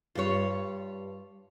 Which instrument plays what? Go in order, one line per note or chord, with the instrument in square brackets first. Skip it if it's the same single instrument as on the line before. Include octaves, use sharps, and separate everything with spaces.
[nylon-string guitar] G2 G3 [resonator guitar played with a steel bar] F4 C#5